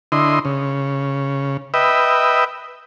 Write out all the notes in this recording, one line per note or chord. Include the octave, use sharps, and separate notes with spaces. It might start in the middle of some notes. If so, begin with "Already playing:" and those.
D3 E4 D#5 C6
C#3
B4 D#5 E5 G5